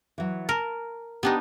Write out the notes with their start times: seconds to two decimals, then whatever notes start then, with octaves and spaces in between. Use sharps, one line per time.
0.18 E3 F#3
0.49 A#4 A5
1.23 B3 D4 D#4 G4 G5